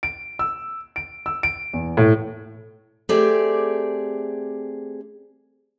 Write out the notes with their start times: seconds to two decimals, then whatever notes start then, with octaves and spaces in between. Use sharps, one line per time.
0.03 D7
0.39 E6
0.96 D7
1.26 E6
1.43 D7
1.73 E2
1.97 A2
3.09 A3 C4 G4 G#4 D5